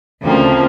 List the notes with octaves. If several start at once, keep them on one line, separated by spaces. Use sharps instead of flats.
D2 C#3 F3 A#3 C4